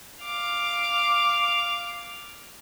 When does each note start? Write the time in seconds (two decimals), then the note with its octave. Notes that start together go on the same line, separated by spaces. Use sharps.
0.24 F5 D6